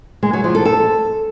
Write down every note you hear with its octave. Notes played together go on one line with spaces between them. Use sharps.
G#3
F#3
F3
A4
A4